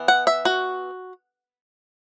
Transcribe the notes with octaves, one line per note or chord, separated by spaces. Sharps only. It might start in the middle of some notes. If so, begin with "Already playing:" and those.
Already playing: E3 B3
F#5
E5
F#4